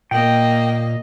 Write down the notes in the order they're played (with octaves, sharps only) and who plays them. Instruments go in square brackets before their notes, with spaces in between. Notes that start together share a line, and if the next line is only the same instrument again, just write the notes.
[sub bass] A#2 [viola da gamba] A#3 D#5 [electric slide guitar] G5